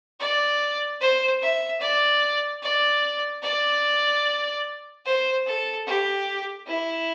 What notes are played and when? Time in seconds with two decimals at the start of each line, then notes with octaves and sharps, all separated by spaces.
0.20 D5
1.01 C5
1.42 E5
1.81 D5
2.62 D5
3.43 D5
5.05 C5
5.46 A4
5.87 G4
6.67 E4